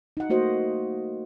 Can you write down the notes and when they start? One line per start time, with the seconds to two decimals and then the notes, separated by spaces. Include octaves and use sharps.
0.17 D#4 F#5
0.30 A3 A#3 F#4 C5 D#5